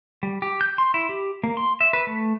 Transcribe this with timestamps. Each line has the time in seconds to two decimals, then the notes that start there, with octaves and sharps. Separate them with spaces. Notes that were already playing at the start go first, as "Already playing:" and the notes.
0.23 G3
0.42 G4
0.61 G6
0.78 C6
0.94 E4
1.09 G4
1.44 A#3
1.57 C6
1.81 E5
1.93 B4
2.07 A3